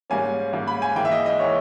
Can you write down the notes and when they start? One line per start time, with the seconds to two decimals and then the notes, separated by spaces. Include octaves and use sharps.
0.10 G#2 G3 A#3 C#4 G#5
0.53 G#2 G3 A#3 C#4
0.68 B5
0.82 G#5
0.96 G#2 E3 A#3 G5
1.05 E5
1.12 D#5
1.26 D#5
1.40 E3 A#3 C#5